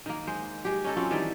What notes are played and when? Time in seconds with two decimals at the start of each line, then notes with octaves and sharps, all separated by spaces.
0.06 D#3 A#3
0.27 G#3 C5
0.65 G#3 G4
0.84 C#4 D#4 A4
0.97 F#3 C4 C#4 F4
1.11 D#3 E3 G3 D5